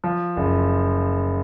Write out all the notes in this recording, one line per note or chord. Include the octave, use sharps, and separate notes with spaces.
F3
F#1